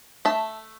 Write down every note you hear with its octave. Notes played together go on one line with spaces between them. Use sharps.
A3 E5 A5